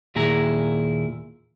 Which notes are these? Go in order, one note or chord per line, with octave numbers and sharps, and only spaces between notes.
D#2 A#2 E4 G#4 A#5